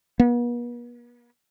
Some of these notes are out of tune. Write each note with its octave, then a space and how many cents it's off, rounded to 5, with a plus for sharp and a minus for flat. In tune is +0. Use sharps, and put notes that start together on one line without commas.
B3 -45